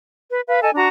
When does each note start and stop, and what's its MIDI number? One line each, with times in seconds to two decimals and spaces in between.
0.30 0.41 71
0.48 0.60 71
0.48 0.60 77
0.63 0.70 69
0.63 0.70 75
0.63 0.70 80
0.75 0.88 62
0.75 0.88 66
0.75 0.88 82